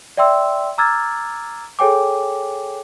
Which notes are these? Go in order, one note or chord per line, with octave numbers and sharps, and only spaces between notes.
D5 E5 G5 C6 E6
A#5 D6 E6 F6 G#6 A6
G#4 A4 C#5 G5 G#5 D6